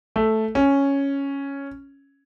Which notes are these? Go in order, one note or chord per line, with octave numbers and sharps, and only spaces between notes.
A3
C#4